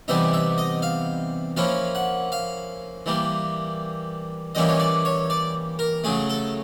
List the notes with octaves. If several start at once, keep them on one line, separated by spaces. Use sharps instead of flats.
C3 E3 G3 B3 D#4 E5
E5
D#5
F5
F3 A#3 C#4 E4 F5
F#5
F5
E3 G3 A#3
E3 G3 A#3 C#4 E4 D#5
C#5
D5
C#5
D5
A#4
C#3 F#3 A3 G#4
A4